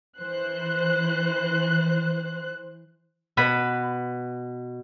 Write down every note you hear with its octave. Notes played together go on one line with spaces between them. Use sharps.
E3 C5 F#6
B2 B4 B5